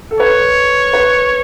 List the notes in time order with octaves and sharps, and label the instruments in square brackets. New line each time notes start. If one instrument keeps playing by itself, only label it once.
[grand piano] A4
[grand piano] B4 [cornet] C#5
[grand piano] B4